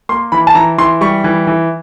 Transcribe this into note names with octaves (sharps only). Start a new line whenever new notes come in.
A#3 C6
E3 B5
A5
E3 A#5
E3 C6
G3 C#6
E3
E3